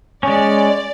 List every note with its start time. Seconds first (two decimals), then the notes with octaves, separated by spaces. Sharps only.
0.23 G#3 C#4 D5